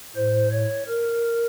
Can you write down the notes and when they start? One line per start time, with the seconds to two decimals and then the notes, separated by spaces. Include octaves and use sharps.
0.16 A2 C5
0.52 C#5
0.87 A#4